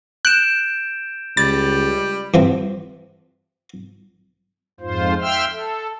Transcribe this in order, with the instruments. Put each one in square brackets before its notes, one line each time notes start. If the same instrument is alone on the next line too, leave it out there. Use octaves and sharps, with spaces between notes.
[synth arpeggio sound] F#6 [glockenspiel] G6 D7 E7
[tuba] C#2 [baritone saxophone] G3 [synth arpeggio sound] A6
[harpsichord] G2 E3 C4
[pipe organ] F2 G#2 F4 C5
E5 G5 C6 E6 F6
A4